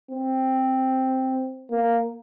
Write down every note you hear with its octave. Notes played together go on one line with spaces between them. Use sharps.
C4
A#3